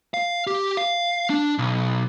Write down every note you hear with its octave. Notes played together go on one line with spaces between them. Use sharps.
F5
G4
F5
D4
B1